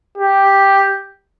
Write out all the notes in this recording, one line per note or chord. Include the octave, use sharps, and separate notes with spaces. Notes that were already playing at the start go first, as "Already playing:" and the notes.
G4